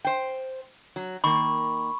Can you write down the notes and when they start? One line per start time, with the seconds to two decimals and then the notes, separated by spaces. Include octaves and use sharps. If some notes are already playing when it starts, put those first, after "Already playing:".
0.05 C5 G5
0.96 F#3
1.24 D#3 A#3 B5 C#6